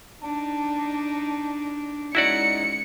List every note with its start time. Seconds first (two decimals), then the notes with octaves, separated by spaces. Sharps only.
0.23 D4 D#4 A5
2.15 G#3 C#4 D#4 E4 F#4 D5 C#7